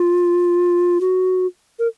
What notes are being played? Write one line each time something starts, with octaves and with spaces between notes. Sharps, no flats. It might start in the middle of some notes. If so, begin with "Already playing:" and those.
Already playing: F4
F#4
A#4